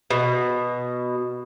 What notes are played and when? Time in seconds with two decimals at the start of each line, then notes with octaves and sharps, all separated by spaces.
0.11 B2